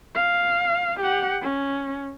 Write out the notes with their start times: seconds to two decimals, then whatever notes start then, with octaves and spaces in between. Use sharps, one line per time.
0.15 F5
1.00 G4 F#5
1.42 C#4